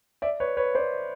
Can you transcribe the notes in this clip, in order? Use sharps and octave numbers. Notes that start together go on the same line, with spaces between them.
D5 E5
B4 C#5
B4 C#5
C5 D5